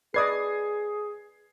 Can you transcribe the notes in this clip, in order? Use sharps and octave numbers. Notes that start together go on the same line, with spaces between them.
G#4 B4 D5 D#5 D#6 G#6 C7